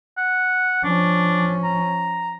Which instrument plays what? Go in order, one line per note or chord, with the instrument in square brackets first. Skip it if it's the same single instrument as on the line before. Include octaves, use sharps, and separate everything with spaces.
[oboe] F#5
[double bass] F3 C#4 [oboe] D4
[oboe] A#5